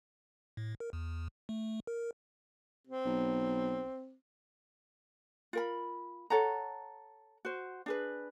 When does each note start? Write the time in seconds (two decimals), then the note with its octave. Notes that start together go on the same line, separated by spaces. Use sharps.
0.57 A2
0.80 A#4
0.93 E2
1.49 A3
1.87 A#4
2.87 C4
3.06 B1
5.53 F4 A#4 B5
6.30 A4 C#5 F#5 A#5
7.45 F#4 C5
7.86 D4 G#4 B4